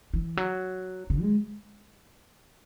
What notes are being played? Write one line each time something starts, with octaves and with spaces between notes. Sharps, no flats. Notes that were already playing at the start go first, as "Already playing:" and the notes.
E3
F#3
C#3
G#3